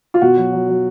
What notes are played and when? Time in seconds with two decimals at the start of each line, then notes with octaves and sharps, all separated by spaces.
0.14 F4
0.21 B2 F#4
0.37 F#3
0.53 F#3
0.68 F#3